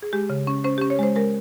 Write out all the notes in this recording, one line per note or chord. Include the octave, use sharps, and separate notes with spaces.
G#4
G#3 G4
C#3
C#4
C#4 C5
C#4 G4
C#5
G#3 C5
G#3 A#4